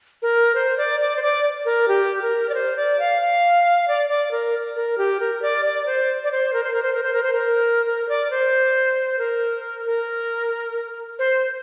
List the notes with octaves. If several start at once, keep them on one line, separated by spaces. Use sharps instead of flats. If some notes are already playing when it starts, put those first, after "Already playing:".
A#4
C5
D5
D5
C5
D5
A#4
G4
A#4
D5
C5
D5
F5
F5
D5
D5
A#4
A#4
G4
A#4
D5
D5
C5
D5
C5
A#4
C5
A#4
C5
A#4
C5
A#4
C5
A#4
A#4
D5
C5
A#4
A#4
C5